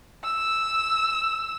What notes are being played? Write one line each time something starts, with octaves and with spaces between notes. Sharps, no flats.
E6